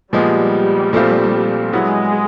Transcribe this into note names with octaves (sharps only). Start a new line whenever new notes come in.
A#2 F3 G3 G#3 B3
A#2 F3 A3 C4 F4
F#3 G#3 B3 E4